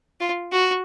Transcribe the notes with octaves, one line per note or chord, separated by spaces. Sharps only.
F4
F#4